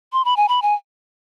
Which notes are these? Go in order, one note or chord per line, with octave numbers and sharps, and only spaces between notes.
C6
B5
G#5
B5
G#5